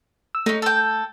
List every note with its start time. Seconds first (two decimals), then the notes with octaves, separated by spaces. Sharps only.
0.35 E6
0.46 A3 C#4 D#4
0.62 A4 G5